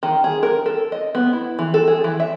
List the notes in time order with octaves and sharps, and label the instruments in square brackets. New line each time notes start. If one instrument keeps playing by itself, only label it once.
[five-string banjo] D#3
G#4
A#4
A4
D#5
B3
E4
E3
A4
G#4
E3
E5